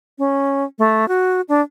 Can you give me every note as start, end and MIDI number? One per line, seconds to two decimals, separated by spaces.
0.18 0.64 61
0.79 1.08 57
1.08 1.41 66
1.49 1.61 62